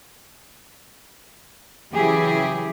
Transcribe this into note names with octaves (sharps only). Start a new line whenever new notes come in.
C#3 E3 F#3 E4 G4 G#4